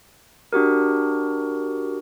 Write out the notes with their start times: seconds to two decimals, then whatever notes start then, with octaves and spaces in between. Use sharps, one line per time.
0.53 D4 F#4 G4 A#4